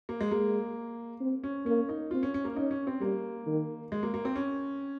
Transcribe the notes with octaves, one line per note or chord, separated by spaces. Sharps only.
A#3
G#3
G#3 A#3
C4
C#4
A#3 C#4
D#4
C4 F4
C#4
C#4
A#3
C#4 D#4
C#4
C4
G3 A#3
D#3
G#3
A#3
A#3
C4
C#4